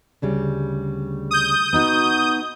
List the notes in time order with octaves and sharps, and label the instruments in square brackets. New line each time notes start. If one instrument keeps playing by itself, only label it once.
[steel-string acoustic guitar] D2 C#3 G3
[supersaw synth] D#6 G6
[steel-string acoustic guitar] B3 D#4 F#4